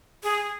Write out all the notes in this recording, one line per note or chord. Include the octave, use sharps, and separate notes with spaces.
G#4